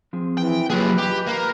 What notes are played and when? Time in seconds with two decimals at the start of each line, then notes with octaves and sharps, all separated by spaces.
0.13 F3 C4 G#4
0.37 E3 G5
0.70 F#3 A#3 F4 G4 G#4 B4
0.98 G4 D#5
1.27 A#3